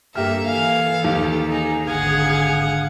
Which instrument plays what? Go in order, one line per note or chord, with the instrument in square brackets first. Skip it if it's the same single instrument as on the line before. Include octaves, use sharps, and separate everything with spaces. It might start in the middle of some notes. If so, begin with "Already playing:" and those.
[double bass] G2 [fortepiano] A#3 G4 F6 [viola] A4 [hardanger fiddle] E5
[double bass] E3 [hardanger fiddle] F5 G#5
[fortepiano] D#2 [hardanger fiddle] G4
[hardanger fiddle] D#4 G#4
[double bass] G#1 D3 [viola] G#4 G#5 [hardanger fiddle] F5 F#5